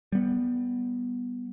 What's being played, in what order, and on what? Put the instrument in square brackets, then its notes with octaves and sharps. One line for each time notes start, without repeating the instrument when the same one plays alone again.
[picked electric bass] G3 B3